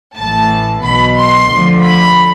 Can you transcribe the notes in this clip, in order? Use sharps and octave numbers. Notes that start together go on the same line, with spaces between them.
A1 A2 E3 A5
B1 B2 B5
C6
D2 D3 F3
B5